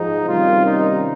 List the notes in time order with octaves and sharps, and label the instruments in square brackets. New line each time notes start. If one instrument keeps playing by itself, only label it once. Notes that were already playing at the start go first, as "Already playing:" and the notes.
Already playing: [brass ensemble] G#2 F3 G#3 D#4
C3 D#3 G3 A#3 C#4 F4
D#4